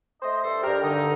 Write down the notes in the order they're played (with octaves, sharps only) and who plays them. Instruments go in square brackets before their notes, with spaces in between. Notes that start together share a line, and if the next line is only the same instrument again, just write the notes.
[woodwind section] A3 C5 D#5
G2 A4 C5
G2 G4 A#4
D3 D#4